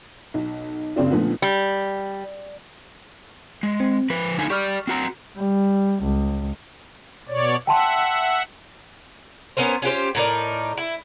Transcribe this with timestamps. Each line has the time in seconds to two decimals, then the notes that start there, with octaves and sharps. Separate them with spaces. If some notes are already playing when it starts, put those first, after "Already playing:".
0.34 B1
0.96 F#1 C#3 C4 D4
1.11 A#2 D3 D#3 F3 A3 B3
1.42 G3
3.63 G#3
3.80 C4
4.10 F3 B4 B5
4.38 D3 D#4 G#5
4.50 G4 D5 C#6 F6
4.87 C4 F#4 A#5
5.36 G3
6.03 C#2
7.28 B2 C#5 D5
7.67 E5 F#5 G5 A5 C6
9.57 B3 C#4 A#4 C5
9.82 C#4 F4 G4 C5
10.15 A2 D#4 A#4 D5
10.78 E4